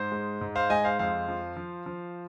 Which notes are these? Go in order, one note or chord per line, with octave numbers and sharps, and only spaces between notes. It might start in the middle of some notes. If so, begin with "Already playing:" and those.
Already playing: G#2 C5
G#3
G#2
C5 F5
G#3 D#5 G#5
C5 F5
F2 C5 F5
F3
F3
F3